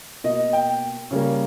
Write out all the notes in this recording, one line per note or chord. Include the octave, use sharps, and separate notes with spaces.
B2 A#3 D#5
G5
C#3 G3 A#3